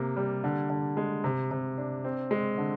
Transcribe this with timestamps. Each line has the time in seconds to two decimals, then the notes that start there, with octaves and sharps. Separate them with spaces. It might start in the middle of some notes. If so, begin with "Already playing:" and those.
Already playing: C3 A#3
0.17 G3
0.44 D3
0.70 D3
0.97 G#3
1.24 C3
1.51 C3
1.78 D4
2.04 C4
2.31 G#3
2.58 D3